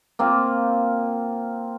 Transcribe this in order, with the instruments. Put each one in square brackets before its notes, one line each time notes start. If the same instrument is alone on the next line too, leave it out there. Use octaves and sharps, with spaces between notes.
[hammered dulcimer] A#3 C4 F4